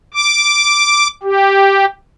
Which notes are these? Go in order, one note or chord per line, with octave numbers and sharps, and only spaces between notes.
D6
G4